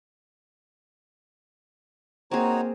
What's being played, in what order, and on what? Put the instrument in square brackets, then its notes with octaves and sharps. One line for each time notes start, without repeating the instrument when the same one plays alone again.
[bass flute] A#3 [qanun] C4 G#4 [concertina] D#4 F#4 C#5